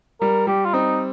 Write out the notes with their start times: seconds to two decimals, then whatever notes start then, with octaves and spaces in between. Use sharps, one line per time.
0.21 G3 A#4
0.47 G3 G4
0.65 F4
0.74 C4 D#4